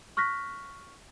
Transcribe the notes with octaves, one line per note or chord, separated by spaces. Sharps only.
C#6 F6 F#6 A#6 B6